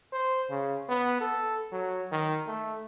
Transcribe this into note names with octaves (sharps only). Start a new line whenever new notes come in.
C5
C#3
B3
A4
F#3
D#3
A3